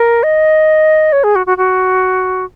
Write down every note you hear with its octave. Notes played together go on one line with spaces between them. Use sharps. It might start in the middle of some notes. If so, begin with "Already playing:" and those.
Already playing: A#4
D#5
C#5
G#4
F#4
F#4
F#4